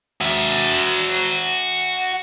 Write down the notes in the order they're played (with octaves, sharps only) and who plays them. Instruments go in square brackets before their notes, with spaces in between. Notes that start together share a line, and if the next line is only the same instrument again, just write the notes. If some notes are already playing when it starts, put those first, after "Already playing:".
[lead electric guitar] F#4 E5